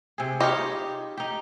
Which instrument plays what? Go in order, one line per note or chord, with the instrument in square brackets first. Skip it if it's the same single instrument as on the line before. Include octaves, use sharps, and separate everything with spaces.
[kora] C3 G#4
[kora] D#4 F4 C#5 [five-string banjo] G4 D#5
[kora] D#4 G4